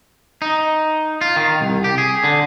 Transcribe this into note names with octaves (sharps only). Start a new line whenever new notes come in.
D#4
F4
D#3
C2
G4
G#4
D3